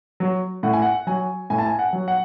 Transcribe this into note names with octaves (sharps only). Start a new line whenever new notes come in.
F#3
A2 F#5
G#5
F#5
F#3 G#5
A2 G#5
A5
G#5
F#5
F#3
F#5